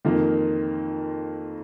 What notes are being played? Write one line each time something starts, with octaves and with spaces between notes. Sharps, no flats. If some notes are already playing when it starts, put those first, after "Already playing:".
F2 D#3 A#3 F4 A#4